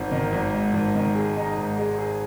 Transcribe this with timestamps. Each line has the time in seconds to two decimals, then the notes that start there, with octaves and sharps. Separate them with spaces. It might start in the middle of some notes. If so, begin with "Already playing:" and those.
Already playing: G#1
0.12 D#3
0.32 G#1
0.54 G#2
0.74 G#1
0.95 D#3
1.15 G#4
1.37 D#4
1.57 G#2
1.77 G#3
1.98 G#4